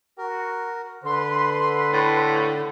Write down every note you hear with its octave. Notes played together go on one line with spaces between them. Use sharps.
F#4 A#4
D3 B4 C6
A2